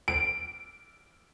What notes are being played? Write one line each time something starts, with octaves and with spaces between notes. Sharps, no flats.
D7